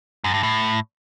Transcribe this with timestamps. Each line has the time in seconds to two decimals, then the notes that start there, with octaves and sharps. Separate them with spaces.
0.24 F#2
0.34 G2
0.43 A2